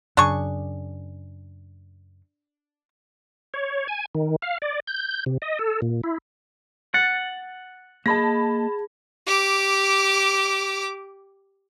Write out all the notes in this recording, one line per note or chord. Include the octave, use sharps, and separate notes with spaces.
F#2 C#3 D4 G#4 C#6
C#5
G#5
D#3
F5
D5
G6
C3
D#5
A4
A#2
E4
F#5 A6
A#3 G#4 D#5 A5 B5 A#6
G4 D6